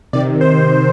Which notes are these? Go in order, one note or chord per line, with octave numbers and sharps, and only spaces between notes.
C3 D#3 D5
C5